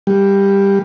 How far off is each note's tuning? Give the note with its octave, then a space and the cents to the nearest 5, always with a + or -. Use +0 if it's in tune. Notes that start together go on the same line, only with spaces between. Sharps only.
G3 +10